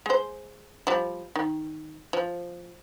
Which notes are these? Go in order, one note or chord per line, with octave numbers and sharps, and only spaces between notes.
G#3 C5
F3 G3
D#3
F3